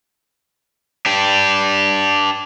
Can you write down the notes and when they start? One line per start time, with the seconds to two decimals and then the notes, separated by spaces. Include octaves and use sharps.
1.06 D4 G4